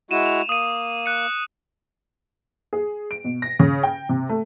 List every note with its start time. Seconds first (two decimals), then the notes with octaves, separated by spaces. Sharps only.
0.11 G#3 E4 F#4 D#7 E7
0.26 F7
0.49 A#3 D#6 D#7
1.06 F#6 C#7
2.73 G#4
3.11 D7
3.24 B2
3.42 A#6
3.60 C#3
3.83 G5
4.09 C3
4.29 A3